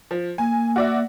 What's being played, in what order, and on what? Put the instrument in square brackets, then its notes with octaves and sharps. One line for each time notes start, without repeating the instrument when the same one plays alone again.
[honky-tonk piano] F3
[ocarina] A#3 [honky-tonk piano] G#5
[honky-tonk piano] F#4 D5 E5